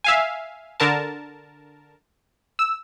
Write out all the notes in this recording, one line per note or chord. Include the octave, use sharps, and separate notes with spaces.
E5 F5 G#5
D3 A#4 A5
E6